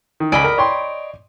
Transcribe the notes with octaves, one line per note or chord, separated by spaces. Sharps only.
D#3
C#2 D5 D#5 G#5 B5
A#4
C#5 G5 C6